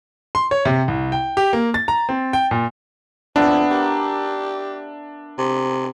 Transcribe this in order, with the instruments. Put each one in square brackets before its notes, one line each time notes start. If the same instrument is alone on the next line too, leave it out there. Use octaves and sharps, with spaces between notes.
[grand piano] C6
C#5
C3
C2
G5
G4
A#3
A6
A#5
C4
G5
A#2
[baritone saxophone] F2 [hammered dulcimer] B3 E5 [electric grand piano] D4
[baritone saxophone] G4 [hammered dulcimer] A#4
[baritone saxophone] C3